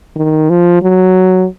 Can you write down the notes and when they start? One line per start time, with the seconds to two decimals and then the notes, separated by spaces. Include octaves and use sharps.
0.16 D#3
0.49 F3
0.82 F#3